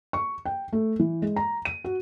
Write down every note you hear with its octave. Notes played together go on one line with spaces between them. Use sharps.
C#6
G5
A3
E3
G#3
A#5
D#7
F#4